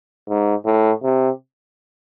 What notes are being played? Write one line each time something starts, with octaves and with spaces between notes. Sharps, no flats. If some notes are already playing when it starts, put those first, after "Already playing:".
G#2
A2
C3